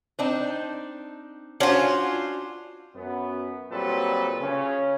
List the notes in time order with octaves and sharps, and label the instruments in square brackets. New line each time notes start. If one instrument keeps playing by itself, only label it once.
[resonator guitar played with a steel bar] C4 D4 D#4
[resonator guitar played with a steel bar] C#4 D4 F#4 [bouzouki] F4 C5
[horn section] F#2 B3
A#2 F#3 G3 C4 A4 B4
C#3 C#4